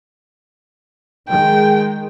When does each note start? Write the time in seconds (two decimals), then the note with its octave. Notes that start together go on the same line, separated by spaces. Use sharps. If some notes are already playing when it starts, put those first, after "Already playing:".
1.29 D#3 G#3 G5